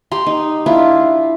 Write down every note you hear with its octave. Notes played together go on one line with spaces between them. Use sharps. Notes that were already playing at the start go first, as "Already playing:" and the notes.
G4 A#5 C6
D#4
D4 E4 F4